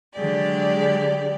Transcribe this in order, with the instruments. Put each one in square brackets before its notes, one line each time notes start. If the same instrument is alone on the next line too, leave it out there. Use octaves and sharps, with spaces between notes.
[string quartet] D3 F#3 G#3 G4 D5